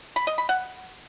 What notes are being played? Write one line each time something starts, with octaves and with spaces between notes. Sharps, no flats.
B5
D#5
B5
F#5